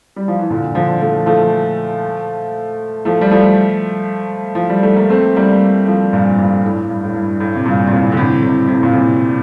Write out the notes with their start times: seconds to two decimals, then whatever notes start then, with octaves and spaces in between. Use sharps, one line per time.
0.16 G3
0.28 F3
0.39 E3
0.50 A#2 D3
0.75 D3 F3
1.01 F3 A3
1.26 F3 A3
3.05 F3 A3
3.21 G3
3.31 F3 A3
4.55 F3
4.69 G3
4.83 A3
4.96 A#3
5.10 A3 C4
5.36 G3 A#3
5.87 F3 A3
6.13 G2 A#2
6.38 G2 A#2
6.63 A2
6.89 G2
7.04 A2
7.15 G2
7.40 A2
7.55 C3
7.65 G2 A#2
7.88 A#2
7.91 A2 C3
8.12 D3
8.17 A2 C3
8.42 A2 C3
8.68 A2 C3
8.83 A#2
8.93 A2 C3